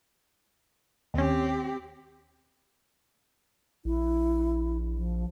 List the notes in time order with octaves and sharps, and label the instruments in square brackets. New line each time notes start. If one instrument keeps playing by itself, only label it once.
[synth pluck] D#2 C#4 [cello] C4 G4
[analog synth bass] A#1 [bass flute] E4
[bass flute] F3